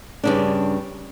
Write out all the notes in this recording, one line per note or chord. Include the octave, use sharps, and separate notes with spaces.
G2 C#3 D4